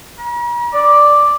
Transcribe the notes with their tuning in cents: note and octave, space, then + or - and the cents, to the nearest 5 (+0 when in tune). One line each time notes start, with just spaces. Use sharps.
A#5 +45
D5 +0